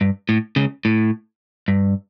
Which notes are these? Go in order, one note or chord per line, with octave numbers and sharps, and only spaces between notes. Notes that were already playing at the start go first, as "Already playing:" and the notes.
G2
A2
C#2 C#3
A2
G2